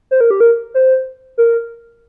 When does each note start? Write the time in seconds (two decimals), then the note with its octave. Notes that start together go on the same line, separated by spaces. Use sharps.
0.11 C5
0.21 A#4
0.31 G4
0.40 A#4
0.74 C5
1.38 A#4